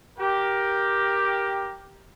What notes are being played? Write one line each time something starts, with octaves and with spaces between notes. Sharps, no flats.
G4 A#4